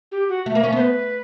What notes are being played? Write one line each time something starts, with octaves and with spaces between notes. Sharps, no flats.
G4
F#4
A3
A#3
C#4
B3 C5
B4